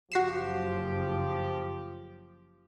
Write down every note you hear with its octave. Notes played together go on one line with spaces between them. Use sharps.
F#1 F#2 C#3 F3 F#4 G4 C7 E7